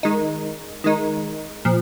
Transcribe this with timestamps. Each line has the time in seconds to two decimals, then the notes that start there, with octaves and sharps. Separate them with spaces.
0.03 D#3 G#3 D#4
0.84 D#3 G#3 D#4
1.65 A#2 F3